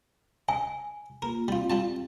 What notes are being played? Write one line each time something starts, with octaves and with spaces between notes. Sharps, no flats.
D#5 G#5
A#3 F4 A#4
G3 C4 F4
G3 F4 A5